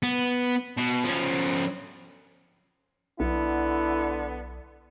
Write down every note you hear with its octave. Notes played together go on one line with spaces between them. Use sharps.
B3
B2
F3 C#4
B1 D3 B3 E4